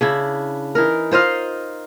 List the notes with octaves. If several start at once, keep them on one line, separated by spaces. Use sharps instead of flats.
C#3 D4 E4
E3 D#4 A#4
F4 C5 D#5 F5